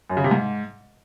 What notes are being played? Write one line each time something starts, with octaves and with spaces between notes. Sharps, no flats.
F#2
C#3
C3
G#2